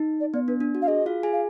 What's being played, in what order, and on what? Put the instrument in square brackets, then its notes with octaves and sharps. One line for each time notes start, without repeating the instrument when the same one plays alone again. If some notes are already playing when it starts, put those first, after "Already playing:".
Already playing: [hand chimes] D#4
[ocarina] D5
[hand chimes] B3 [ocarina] D5
[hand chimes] D4 [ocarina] B4
[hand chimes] D4
F#4
[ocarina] F5
[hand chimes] G#4 [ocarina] D#5
[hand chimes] F4 F5
G#4 G#5
[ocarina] F5